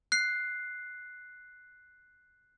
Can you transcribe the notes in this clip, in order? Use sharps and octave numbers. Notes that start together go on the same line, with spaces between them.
F#6 C7